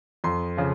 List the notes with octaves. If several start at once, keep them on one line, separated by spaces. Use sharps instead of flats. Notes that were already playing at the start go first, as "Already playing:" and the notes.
F2 C6
C#3 F3